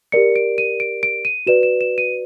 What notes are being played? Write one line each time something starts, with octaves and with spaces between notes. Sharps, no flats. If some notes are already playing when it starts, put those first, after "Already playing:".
G4 A#4 D5 C#7
D7
D#7
D7
D7
D#7
F#4 B4 D5 E7
E7
E7
D#7